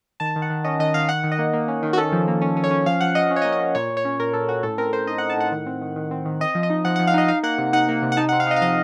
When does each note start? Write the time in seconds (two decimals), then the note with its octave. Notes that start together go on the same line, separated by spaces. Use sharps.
0.20 D#3 A5
0.36 D#3
0.42 F#5
0.50 D#3
0.64 C#4 D#5
0.79 D#3 D#5
0.94 D#3 F5
1.09 D#3 F#5
1.24 D#3
1.32 D#5
1.39 A#3
1.53 A#3
1.68 C#4
1.83 D#3
1.93 F#4
1.98 C#4 A4
2.12 F3
2.28 A#3
2.42 C#4
2.57 C#4
2.64 C#5
2.71 C#4
2.86 F3 F5
3.01 F3 F#5
3.15 F3 D#5
3.30 C#4
3.36 C#5
3.42 D#5
3.45 A#3
3.52 D#5
3.60 C#4
3.75 A#2 C#5
3.90 A#2
3.97 C#5
4.05 C#4
4.19 A#2 A#4
4.33 A#2 A4
4.48 C#4 F#4
4.63 A2 A4
4.78 C4 A#4
4.92 C4 C5
5.07 D#4 D#5
5.18 F#5
5.22 D#4
5.30 A5
5.37 A2 F#5
5.52 D#3
5.66 C4
5.82 D#3
5.96 D#3
6.11 C4
6.25 D#3
6.40 C4 D#5
6.55 F3
6.63 D#5
6.70 D#4
6.85 F3 F#5
6.96 F#5
6.99 F3
7.07 F5
7.14 D#4 D#5
7.28 D#4 F5
7.43 A#3 F#5
7.58 C3
7.73 D#4 F#5
7.89 A#3
8.02 C3
8.12 F#5
8.17 D#4 A5
8.29 F#5
8.32 C4
8.40 F5
8.47 D#4 D#5
8.56 F5
8.62 F3 D#5